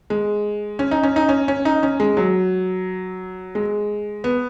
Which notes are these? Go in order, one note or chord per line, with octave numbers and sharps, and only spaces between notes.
G#3
C#4
D#4
C#4
D#4
C#4
C#4
D#4
C#4
G#3
F#3
G#3
B3